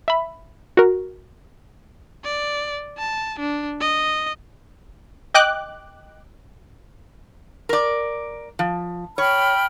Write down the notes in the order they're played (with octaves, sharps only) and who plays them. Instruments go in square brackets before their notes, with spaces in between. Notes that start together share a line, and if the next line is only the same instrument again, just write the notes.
[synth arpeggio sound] E5 B5
F#4 A#4
[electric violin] D5
A5
D4
D#5
[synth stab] D#5 G5 D6 F#6
[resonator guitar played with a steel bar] A#4 D5
F3
[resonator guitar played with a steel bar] C#5 [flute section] G5 B5 F6